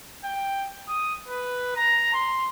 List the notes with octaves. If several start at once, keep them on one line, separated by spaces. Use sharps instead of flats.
G5
D#6
B4
A#5
C6